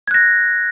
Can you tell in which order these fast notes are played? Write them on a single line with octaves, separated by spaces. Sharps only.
G#6 F#6 A#6